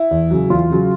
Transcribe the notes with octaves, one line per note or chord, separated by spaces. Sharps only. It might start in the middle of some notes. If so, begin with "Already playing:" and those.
Already playing: E4
E2
C#3 F#3
E2 F4
C#3 F#3